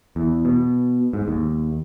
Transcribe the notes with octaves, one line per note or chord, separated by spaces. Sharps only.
E2
B2
G#2
D#2